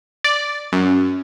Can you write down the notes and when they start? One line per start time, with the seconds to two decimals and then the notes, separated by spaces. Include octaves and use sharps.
0.24 D5
0.72 F#2